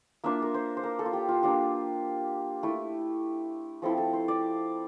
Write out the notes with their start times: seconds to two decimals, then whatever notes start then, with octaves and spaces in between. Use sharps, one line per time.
0.24 A#3 D4 F4 E5
0.42 A#4
0.54 C5
0.77 C5
0.83 A#4
0.99 A4
1.06 F4
1.13 G4
1.29 F4
1.43 A#3 D4 F4 G4
2.63 A3 E4
3.82 F3 C4 E4 A4
3.98 A4
4.13 C5
4.28 D5